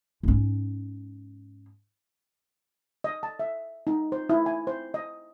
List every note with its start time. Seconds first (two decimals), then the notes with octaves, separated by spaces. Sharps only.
0.23 G#2 C#4
3.04 D#5
3.23 A5
3.39 E5
3.87 D#4
4.12 C5
4.30 E4
4.46 G#5
4.67 C5
4.94 D#5